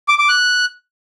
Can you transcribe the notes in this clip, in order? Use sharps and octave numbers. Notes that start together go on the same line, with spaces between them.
D6
D6
F#6